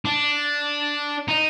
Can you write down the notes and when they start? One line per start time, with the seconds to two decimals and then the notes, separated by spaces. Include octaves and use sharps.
0.05 D4
1.28 D#4